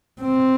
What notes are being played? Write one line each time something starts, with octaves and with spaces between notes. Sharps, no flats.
C4